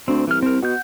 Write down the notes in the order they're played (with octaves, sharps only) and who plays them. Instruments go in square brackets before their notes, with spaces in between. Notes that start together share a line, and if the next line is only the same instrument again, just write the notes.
[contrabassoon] D2 [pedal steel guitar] C4
[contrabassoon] C2 [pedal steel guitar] E3 F6
[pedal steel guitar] C4 A#4
[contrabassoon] B2 [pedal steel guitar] F#5 G6